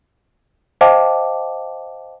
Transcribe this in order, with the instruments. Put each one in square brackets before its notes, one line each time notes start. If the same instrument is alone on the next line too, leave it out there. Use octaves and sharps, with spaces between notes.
[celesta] C5 D#5 F5 G5 A5 D6